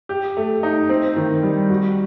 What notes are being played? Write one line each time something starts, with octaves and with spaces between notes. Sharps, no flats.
G4
A3
D#4
C4
D#3
G3
F#4